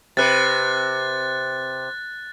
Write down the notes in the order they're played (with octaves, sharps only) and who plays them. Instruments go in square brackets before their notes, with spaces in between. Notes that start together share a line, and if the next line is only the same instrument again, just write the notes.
[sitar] C3 B4 [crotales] F#6 A6